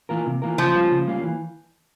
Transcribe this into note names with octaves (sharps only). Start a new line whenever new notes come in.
E3 A#3 F4 A#4
C3
E3 A#3 F4 A#4
C#3 F3
G3 A#3 C#4 F4
C#3
G3 A#3 C#4 F4
E3